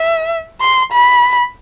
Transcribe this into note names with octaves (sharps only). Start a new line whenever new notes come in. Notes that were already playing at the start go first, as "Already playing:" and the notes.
Already playing: E5
C6
B5